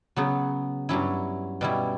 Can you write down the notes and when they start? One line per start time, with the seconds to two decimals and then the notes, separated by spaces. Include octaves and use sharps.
0.16 C#3 F#3 B3
0.89 G2 F#3 C#4 E4
1.61 B2 G3 C#4 E4